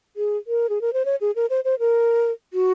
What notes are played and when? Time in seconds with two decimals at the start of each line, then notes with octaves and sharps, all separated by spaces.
0.16 G#4
0.47 A#4
0.69 G#4
0.81 A#4
0.93 C5
1.05 C#5
1.21 G#4
1.36 A#4
1.50 C5
1.65 C5
1.79 A#4
2.53 F#4